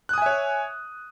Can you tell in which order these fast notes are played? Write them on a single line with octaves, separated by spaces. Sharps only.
F#6 D#6 G#5 E5 C#5